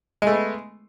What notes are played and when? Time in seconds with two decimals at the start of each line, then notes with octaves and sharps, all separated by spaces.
0.22 G#3
0.27 A3
0.32 B3